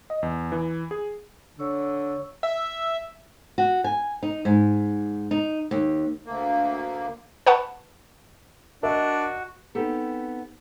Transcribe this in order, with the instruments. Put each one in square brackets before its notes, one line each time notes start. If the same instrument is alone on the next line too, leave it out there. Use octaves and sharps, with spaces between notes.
[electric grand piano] D#5
E2
E3
G#4
[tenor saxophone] D3 [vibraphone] C#5 C#6 E6
[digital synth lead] E5
[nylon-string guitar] F#4
G#5
D#4
G#2
D#4
D#2
[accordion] D2 A#3
[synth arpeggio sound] B4 F#5 A5 B5 C#6
[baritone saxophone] D4 [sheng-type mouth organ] F#4 [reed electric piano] A#4 [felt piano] D#5 E5
[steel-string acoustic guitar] B3 C4 D#4 G4 A4